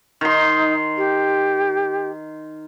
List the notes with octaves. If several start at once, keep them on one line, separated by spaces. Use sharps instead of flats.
D#3 D#4 C6
G4